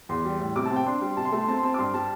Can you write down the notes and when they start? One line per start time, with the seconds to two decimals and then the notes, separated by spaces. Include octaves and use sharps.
0.09 E2 C6
0.25 G3
0.40 A2
0.56 C3 D6
0.66 A5
0.71 C4
0.76 G5
0.86 D4 C6
1.01 G3 C6
1.17 C3 A5
1.25 C6
1.32 A3 A5
1.41 C6
1.48 C4 A5
1.57 C6
1.63 C4 A5
1.74 D6
1.78 G2 C6
1.94 G3 A5